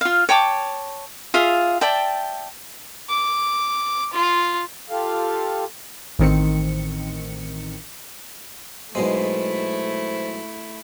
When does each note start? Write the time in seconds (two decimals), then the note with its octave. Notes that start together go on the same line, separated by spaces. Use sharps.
0.01 F4 F5
0.29 C#5 G5 A5 D6
1.34 F4 G#4 E5 F5
1.81 D5 E5 G5 A5
3.09 D6
4.13 F4
4.90 F4 G4 A4 F5
6.19 A1 D#3 C4 C#7
8.95 B1 B2 G#3 A3 E4 C5